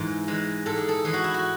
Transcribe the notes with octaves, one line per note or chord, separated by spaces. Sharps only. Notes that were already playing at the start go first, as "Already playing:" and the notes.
Already playing: G#2 E3 G#3 G#4
E3 G#3
G#2 A4
G#4
A4
E3 G#3 G#4
F#4
E4
F#4